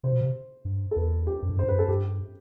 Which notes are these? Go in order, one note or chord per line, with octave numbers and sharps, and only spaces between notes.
C3 C5
B2
C3
G2
A4
E2 B4
G4
F#2
G2
F#2
C5
G2
F#2 B4
A4
G2 G4